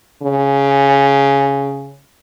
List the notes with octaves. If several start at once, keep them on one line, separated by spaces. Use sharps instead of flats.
C#3